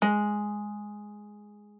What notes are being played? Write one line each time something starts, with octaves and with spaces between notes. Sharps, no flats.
G#3